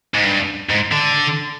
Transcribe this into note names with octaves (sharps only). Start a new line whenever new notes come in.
G#2
G2
G#2
D3